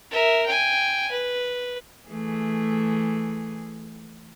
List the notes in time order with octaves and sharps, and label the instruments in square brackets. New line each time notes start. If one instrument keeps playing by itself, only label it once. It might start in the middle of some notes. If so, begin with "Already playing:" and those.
[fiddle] A#4 E5
G5 G#5
B4
[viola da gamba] E3 A3 G#4